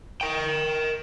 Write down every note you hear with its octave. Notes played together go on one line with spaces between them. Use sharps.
A#4 G5